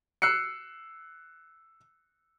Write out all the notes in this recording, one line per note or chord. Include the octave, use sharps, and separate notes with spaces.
E6 F#6 C7 C#7